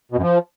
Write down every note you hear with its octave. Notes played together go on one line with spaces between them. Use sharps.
B2
F#2
F3